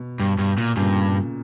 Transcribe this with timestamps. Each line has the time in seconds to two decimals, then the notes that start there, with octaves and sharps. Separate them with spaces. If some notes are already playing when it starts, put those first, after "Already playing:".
Already playing: B2
0.20 G2
0.38 G2
0.58 A#2
0.77 G2 A#2 C#3